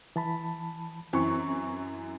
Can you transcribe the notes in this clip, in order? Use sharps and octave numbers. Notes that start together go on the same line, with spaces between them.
E3 A5 B5
F#2 E3 C4 C#6